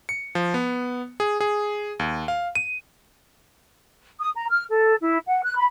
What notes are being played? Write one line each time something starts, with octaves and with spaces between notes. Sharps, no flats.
C#7
F3
B3
G#4
G#4
D#2
F5
D#7
D#6
A#5
F6
A4
E4
F#5
F#6
B5